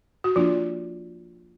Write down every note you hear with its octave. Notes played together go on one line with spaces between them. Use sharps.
F#4
F3 A#3 D4 F4